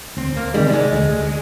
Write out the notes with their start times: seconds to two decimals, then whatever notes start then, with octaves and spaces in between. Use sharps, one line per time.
0.17 D2 C4
0.36 A#3
0.54 C3 D#3 G3 G#3
0.67 G3
0.73 G#3
0.93 D2